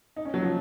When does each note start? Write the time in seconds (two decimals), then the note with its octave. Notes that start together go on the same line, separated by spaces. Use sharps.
0.16 D#4
0.25 C#4
0.34 F#3
0.42 F3